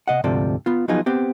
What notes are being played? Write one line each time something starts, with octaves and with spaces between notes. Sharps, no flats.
C3 D#5 F#5
D2 G#2 C3 F3 A4 D5
B3 F4
F3 F#3 B3 D#4 F4 G#4
B3 C4 G4